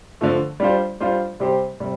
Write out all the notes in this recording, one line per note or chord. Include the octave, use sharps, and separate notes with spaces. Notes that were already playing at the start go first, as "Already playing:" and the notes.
D3 F3 A3
G3 D4 F4 C5
G3 D4 F4 C5
C3 G3 C4 G4 C5
C3 G3